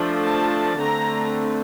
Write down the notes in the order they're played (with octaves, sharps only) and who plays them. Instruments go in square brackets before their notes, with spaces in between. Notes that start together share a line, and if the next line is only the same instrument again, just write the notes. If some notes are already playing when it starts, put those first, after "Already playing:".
Already playing: [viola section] F3 A3 D4
A5
D3 A3 C4 A#5